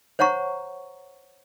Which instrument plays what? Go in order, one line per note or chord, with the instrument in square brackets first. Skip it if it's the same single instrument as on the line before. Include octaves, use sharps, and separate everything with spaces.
[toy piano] C5 C#5 F#5 A#5 C#6